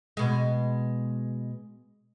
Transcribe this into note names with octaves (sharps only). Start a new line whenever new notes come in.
B2 G#3